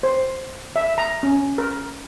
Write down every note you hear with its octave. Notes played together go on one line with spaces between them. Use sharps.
C5
E5
A#5
C#4
A#4